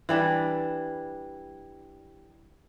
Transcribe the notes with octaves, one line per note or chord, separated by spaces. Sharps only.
E3 G3 D4